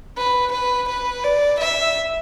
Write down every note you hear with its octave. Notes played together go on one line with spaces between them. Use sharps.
B4
B4
B4
D5
E5